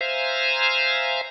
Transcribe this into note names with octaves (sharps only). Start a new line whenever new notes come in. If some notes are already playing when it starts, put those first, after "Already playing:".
C5 E5 F5 G#5 A#5